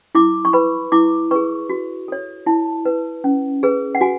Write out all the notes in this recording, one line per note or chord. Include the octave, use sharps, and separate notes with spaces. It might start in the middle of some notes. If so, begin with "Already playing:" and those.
E4 D6
C#6
B4 B5
E4 D6
G#4 B4 C#6
F#4
A4 C#5
E4 A5
B4
C#4
G#4 B4
F#5
F#4 G#5